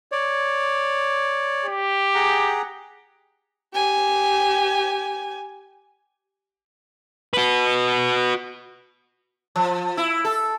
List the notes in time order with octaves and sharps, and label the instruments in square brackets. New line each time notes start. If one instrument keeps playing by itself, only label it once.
[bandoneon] C#5 D5
[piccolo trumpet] G4
[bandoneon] G#4 F#5 A#5
[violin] G4 G#5
[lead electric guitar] F#4 B4
[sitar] F3
E4
A4